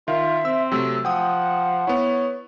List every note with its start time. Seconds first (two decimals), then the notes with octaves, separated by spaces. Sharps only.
0.08 D#3 F4 E5
0.45 C4 E6
0.71 C3 F#3 A3 E6
1.05 F3 F#5 G5 D#6
1.87 B3 E4 C#5